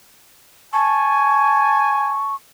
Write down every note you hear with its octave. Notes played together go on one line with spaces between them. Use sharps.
G#5 A5 C#6